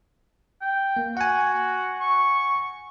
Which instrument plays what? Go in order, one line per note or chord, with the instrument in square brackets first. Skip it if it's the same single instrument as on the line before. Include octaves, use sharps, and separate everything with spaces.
[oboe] G5
[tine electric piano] A#3
[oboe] F#4 [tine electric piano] F#5 G#5
[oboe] C#6